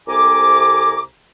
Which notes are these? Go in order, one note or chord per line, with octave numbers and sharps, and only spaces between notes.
C2 C3 A4 G#5 A#5 D6